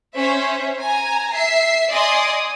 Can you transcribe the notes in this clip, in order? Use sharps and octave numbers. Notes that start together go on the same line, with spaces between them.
C#4 C5 E5
G#5 A#5
E5 C7
D5 D#5 G#5 C6 D#6